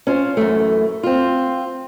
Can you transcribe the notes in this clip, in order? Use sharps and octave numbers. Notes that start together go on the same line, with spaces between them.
C#4 F4 C5
F#2 E3 A3
C4 F4